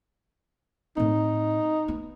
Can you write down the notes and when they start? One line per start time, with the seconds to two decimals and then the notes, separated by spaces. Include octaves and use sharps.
0.97 A2 C4 D#4
1.88 B3